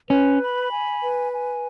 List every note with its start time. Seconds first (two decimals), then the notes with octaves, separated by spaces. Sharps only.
0.09 C#4 B4
0.41 B5
0.72 G#5
1.02 B4
1.33 G#5